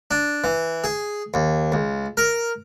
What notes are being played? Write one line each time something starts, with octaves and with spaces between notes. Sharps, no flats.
D4
E3
G#4
D#2
C#2
A#4